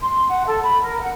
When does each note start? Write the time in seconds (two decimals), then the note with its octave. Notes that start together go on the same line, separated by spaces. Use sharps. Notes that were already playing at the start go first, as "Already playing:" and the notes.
0.02 C6
0.28 F#5
0.47 A4
0.63 B5
0.83 A#4
1.01 F#5